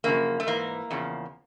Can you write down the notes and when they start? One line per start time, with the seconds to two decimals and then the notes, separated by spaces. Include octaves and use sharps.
0.04 F#2 C#3 F3 A#3
0.40 A3
0.47 G#2 E3 A#3
0.91 E2 C#3 F3